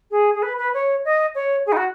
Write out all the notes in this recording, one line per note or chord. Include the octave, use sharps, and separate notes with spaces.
G#4
G#4
B4
B4
C#5
D#5
C#5
G#4
D#4
F#4